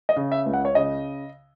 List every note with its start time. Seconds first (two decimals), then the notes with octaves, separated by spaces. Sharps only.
0.09 D#5
0.16 C#3
0.32 E5
0.46 C#2
0.54 F#5
0.65 C#5
0.75 C#3 D#5